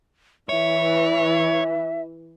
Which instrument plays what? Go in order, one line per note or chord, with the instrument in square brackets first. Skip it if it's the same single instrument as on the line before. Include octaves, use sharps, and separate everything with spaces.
[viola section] E3 [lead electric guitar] C#5 [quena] E5